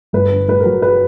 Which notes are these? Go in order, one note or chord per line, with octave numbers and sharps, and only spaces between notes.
G1 B4
D3
G2 B4
A#4
F#3
B4